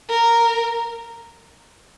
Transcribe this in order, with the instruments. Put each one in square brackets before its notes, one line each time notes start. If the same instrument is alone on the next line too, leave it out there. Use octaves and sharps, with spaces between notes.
[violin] A#4